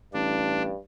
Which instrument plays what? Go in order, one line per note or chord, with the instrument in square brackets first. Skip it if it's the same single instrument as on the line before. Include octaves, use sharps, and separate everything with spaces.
[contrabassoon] A1 [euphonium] G2 [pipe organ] D4